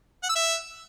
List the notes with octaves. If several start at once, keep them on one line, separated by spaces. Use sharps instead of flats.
F#5
E6
E5